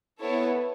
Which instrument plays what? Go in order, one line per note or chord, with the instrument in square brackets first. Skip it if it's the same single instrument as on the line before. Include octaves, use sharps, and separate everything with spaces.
[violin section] B3 E4 A4 C#5